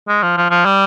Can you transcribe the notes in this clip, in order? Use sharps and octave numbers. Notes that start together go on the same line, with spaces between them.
G#3
F3
F3
F3
G3